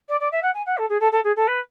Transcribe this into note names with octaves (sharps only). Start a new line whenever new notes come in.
D5
D5
E5
F#5
G#5
F#5
A4
G#4
A4
A4
G#4
A4
B4